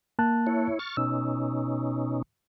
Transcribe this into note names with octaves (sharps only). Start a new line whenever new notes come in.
A#3 A5 F#6
E4 C#5
C#6 F6 A6
B2 C#4 D#4 E6